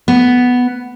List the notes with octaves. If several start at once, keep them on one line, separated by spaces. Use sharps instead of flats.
B3